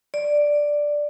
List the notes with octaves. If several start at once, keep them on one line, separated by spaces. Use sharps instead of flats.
D5